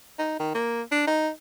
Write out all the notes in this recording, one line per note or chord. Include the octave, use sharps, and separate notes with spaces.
D#4
D#3
A#3
D4
D#4